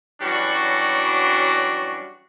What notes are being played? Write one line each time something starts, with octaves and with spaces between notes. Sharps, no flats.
E3 F#3 G3 C#4 D4 F#4